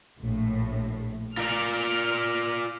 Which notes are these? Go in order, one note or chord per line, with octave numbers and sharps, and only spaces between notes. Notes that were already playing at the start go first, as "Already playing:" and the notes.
A#1 A2
F4 A#4 D5 F6